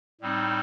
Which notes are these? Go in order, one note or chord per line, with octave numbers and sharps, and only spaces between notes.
A2 G3 C4 D#4